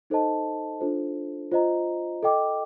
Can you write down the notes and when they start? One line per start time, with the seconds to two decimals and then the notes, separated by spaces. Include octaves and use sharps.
0.10 D#4 A4 C5 D#5 A5
0.80 D4 F4 A4 C5
1.51 F4 C5 D#5 A#5
2.23 A4 D#5 G5 D6